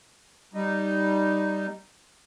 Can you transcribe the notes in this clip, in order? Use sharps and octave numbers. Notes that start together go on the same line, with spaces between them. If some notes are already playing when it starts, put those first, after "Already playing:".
G3 D#4